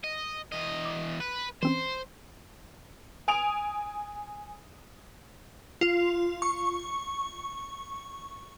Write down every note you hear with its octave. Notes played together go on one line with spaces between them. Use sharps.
D#5
E2 D#5
D6
B4
E3 C4 C#4 C5
G#5 D#6 D7 F7
F4
C#6